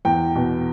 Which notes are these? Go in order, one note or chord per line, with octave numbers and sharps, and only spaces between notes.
E2 G5
B2